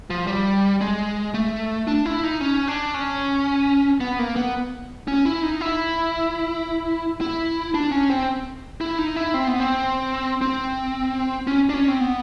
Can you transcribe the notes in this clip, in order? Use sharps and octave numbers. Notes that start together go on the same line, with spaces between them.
F3
G3
G#3
A3
D4
E4
D#4
C#4
D4
C#4
B3
A#3
B3
C#4
E4
D#4
E4
E4
D4
C#4
C4
E4
D#4
E4
C4
B3
C4
C4
C#4
D4
C#4
C4
B3